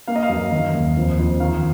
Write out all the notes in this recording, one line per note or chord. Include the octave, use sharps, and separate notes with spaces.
A#3 F5
D#5
F5
F#2
D#3
D#2
F2
F2
D#3 F5